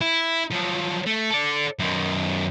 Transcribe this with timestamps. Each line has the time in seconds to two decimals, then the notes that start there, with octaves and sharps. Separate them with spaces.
0.01 E4
0.50 F3 F#3
1.06 A3
1.30 A4 D5
1.79 F#2 D#3